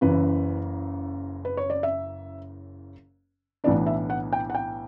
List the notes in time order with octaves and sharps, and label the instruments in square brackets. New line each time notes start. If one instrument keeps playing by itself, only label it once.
[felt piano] F#1 F#2 C#3 E3 B4
B4
C#5
D5
E5
B1 A2 E3 B3 D4 D5
E5
F#5
G5
F#5
G5